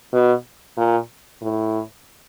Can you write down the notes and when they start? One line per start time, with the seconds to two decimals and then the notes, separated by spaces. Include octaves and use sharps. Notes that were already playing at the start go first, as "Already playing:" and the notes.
0.13 B2
0.78 A#2
1.42 A2